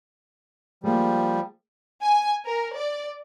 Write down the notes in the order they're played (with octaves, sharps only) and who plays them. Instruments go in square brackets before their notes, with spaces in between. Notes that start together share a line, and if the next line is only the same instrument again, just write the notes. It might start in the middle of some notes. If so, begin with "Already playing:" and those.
[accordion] F3 G3 [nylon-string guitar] G#3 A#3
[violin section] G#5
A#4
D5